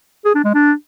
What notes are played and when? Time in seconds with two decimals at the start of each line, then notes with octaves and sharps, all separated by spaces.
0.25 G#4
0.35 D4
0.44 G#3
0.54 D4